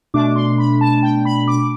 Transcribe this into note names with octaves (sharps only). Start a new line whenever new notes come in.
B2 A3 D4 D6
C6
B5
A5
G5
B5
D6